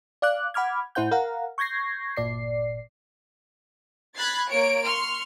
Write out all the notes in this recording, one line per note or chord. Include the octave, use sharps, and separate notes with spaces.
D5 F5 D6 F#6
F#5 B5 D6 F6 G#6
A2 E4 C5 F#5 G6
A#4 F5 F#5 A#5
C#6 G6 G#6 A#6 C7
G1 A#2 D5 C7
B5 F#6 G#6 A6 C7
A#3 C#5 D7
C6 C#6 F6